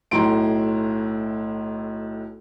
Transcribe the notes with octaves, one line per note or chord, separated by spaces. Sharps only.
B1 A2 E4 A#5 C6 D7